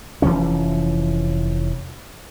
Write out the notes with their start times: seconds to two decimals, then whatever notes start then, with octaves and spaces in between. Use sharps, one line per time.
0.22 F1 E3 F3 C#4